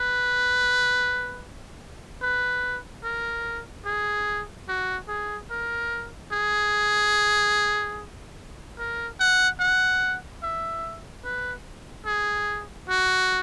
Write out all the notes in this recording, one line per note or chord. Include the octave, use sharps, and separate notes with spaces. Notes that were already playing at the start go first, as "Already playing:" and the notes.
Already playing: B4
B4
A#4
G#4
F#4
G#4
A#4
G#4
A#4
F#5
F#5
E5
B4
G#4
F#4